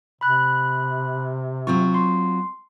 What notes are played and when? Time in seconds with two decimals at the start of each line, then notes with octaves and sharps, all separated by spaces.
0.21 C3 B5 F#6
1.67 F#3 C4 F4 C#6
1.94 C6